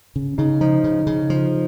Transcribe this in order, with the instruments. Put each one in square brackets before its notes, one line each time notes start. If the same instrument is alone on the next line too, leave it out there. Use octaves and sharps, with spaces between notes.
[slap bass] C#3
[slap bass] C#3 [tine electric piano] D#4
[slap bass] F3 [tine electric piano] D#4
[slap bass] C#3
C#3
F3